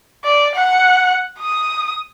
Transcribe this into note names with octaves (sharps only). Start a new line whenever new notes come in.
D5
F#5
D#6